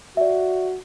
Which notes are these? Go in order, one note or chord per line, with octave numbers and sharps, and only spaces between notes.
F#4 D5 E5